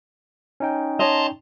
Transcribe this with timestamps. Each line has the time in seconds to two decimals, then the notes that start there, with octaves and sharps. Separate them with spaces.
0.60 C#4 D#4 G5
0.99 C#5 D#5 A5 A#5 C6